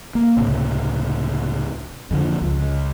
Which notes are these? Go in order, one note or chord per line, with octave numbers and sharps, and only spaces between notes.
A#3
C#2 A2 C3
F2 D3 F3
C#2